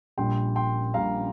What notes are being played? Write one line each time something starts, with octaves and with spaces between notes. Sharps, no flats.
A#1 A#2 G3 G5 C6
G5 C6
A#1 A#2 G3 F5 A#5